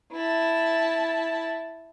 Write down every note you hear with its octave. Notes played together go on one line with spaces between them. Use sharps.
E4 A5